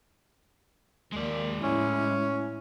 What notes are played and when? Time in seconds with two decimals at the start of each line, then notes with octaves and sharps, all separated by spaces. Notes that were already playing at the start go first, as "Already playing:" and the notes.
1.12 D#2 G#3 A#3 D5
1.63 A2 C#4 E4